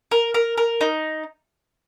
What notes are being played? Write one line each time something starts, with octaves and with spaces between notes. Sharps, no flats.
A#4
A#4
A#4
D#4